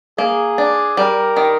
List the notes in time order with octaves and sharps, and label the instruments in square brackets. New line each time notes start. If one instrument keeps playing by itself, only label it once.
[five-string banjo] A#3 [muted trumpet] G#4
[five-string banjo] D4
[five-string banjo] G3 [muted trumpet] A#4
[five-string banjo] D#3